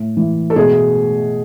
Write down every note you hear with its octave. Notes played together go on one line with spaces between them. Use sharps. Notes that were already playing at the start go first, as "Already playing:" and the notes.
Already playing: A2
E3
A4
B2 G#4